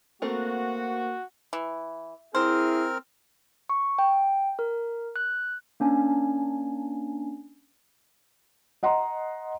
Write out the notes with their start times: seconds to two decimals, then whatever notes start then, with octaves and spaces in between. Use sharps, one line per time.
0.22 A3 A#3 C4 F#4 A#4
1.53 E3
2.35 C4 E4 G#4 A#4 C5 F6
3.69 C#6
3.99 G5
4.59 A#4
5.16 F#6
5.80 A#3 C#4 D4 G#5
8.83 D#5 F#5 A#5 C6